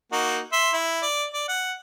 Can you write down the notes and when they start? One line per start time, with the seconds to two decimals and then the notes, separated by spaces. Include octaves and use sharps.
0.12 A#3 D#4 F#4
0.53 E5 C6
0.73 E4
1.02 D5
1.34 D5
1.48 F#5